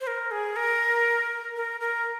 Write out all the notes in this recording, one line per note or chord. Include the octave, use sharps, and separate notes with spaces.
C5
A#4
G#4
A#4
A#4
A#4